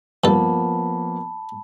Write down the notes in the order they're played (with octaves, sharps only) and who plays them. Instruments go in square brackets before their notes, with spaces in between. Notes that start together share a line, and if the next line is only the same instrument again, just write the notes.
[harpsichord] G2 A4 [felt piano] F3 A#3 B3 [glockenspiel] A5 B5